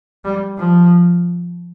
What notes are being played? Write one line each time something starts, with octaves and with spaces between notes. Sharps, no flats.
G3
F3